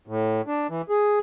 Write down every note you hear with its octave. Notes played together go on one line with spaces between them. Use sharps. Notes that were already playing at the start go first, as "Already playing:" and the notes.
A2
D4
E3
G#4